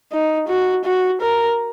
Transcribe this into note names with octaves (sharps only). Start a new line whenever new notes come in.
D#4
F#4
F#4
A#4